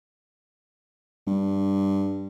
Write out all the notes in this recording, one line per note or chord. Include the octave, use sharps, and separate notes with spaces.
G2